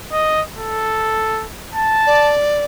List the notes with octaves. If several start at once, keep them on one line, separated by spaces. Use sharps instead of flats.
D#5
A4
A5
D5